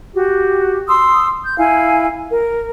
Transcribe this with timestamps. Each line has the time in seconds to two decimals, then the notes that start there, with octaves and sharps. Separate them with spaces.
0.14 F#4 G4
0.87 C6 D#6 E6
1.43 G6
1.57 E4 F5 G#5
2.31 A#4